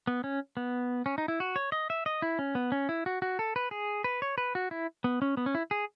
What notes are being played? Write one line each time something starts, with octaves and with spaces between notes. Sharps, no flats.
B3
C#4
B3
C#4
D#4
E4
F#4
C#5
D#5
E5
D#5
E4
C#4
B3
C#4
E4
F#4
F#4
A4
B4
G#4
B4
C#5
B4
F#4
E4
B3
C#4
B3
C#4
E4
G#4